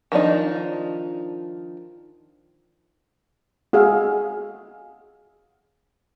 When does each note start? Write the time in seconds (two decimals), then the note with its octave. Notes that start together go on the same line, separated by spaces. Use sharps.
0.12 D#3 F3 D4 D#4
3.73 F#4 G#4 E5 F5